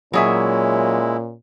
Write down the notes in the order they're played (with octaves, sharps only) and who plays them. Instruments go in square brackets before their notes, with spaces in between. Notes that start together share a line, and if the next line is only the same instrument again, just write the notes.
[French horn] A#2 [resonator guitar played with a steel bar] F#3 G#4 E5 [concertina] G#3 E4 [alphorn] C#4